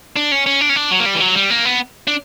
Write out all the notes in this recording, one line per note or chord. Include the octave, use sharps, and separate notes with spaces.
D4
C#4
C#4
D4
C#4
D4
F#3
A#3
G3
E3
F#3
G3
A#3
B3
D4